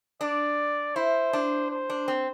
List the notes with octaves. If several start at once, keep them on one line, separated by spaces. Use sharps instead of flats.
D4 D5
E4 C5
D4
C5
D4
C4